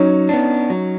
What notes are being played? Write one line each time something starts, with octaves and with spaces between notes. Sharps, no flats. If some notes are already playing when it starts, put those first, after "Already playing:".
Already playing: F#3 C#4 D#4
B3 D4
F#3